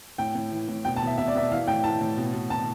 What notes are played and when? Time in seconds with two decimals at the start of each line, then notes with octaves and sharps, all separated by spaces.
0.18 A2 G5
0.35 A2
0.51 E3
0.69 A2
0.85 B2 G5
0.96 A5
1.02 B2
1.07 E5
1.18 B2 E5
1.28 D5
1.35 B2 E5
1.52 E3 F5
1.67 A2 G5
1.84 E3 A5
2.01 A2
2.17 B2
2.33 B2
2.50 B2 A5